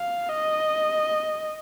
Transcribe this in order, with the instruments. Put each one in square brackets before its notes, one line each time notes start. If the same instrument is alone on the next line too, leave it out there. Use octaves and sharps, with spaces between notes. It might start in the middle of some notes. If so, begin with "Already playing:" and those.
Already playing: [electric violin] F5
D#5